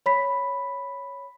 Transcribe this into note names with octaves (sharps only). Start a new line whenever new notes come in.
C#5 B5 B6